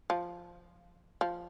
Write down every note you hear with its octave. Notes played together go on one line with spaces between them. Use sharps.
F3
F3